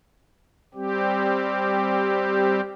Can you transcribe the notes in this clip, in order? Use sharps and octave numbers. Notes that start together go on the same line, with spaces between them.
G3 C4 G4